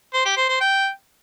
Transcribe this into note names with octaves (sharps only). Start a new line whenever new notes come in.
C5
G4
C5
C5
G5